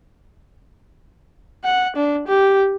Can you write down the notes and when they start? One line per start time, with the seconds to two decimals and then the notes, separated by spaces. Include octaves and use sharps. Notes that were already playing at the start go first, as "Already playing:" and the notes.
1.64 F#5
1.96 D4
2.28 G4